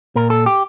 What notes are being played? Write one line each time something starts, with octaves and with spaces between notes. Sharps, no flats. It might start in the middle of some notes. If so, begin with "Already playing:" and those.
A#2 A#4
A4
G4